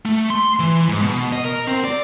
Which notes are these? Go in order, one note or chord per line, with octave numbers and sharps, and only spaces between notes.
A3
C6
E3
G#2
B2
D#5
A#4
C4
D5